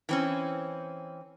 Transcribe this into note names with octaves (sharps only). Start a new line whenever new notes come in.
E3 C4 C#4